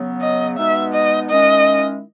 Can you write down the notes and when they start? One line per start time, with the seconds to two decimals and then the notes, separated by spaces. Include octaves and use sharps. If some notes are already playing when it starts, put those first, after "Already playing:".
Already playing: C#3 F#3 B3
0.21 D#5
0.57 B2 G#3 B3 D#4 E5
0.94 D#5
1.29 D#3 G#3 C#4 E4 D#5